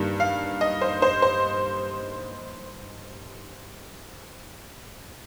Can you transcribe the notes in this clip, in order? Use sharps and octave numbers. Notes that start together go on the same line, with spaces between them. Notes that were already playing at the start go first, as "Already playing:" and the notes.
Already playing: G2 D#3 G3 A#3
F5
D#5
C5
C5
C5